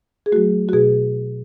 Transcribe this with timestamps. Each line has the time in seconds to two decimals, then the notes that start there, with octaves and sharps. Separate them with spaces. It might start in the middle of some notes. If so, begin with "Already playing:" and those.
0.26 G#4
0.32 F#3 A3 F#4
0.69 F#4
0.73 B2 G#4